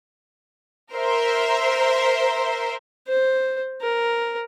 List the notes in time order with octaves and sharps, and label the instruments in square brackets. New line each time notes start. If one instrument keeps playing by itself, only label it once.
[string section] A#4 C5 E5 C6
[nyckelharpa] C5
A#4